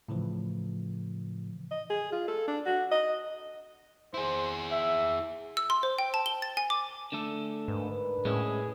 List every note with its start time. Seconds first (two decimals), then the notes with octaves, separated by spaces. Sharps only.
0.08 A2 C#3 E3 F3
1.71 D#5
1.90 G#4
2.12 F4
2.28 A4
2.48 D4
2.66 F#4
2.91 D#5
4.14 E4 G#4 C5
4.72 E5
5.57 E6
5.70 C6
5.83 C5
5.99 G5
6.14 A5
6.26 G7
6.42 A6
6.57 G#5
6.70 D6
7.12 D3 A3 A4
7.68 G#2 D4 A#4 B4
8.25 A2 G#3 C#4 E4 G#4